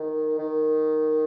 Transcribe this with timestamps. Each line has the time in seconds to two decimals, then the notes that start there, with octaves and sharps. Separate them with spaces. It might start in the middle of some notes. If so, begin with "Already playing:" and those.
Already playing: D#3
0.39 D#3